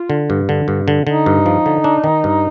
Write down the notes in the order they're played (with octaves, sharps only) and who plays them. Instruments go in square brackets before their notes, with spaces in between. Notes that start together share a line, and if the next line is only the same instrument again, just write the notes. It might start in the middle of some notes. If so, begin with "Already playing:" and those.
Already playing: [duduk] F4
[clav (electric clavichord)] D3
G2
D3
G2
D3
[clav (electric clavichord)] D3 [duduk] D#4
[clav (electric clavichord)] G2
F3
D3
D4
D#3
G2